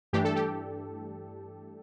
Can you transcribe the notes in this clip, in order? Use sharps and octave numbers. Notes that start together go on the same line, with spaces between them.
G2 E3 A3 D4 G4
A4
G4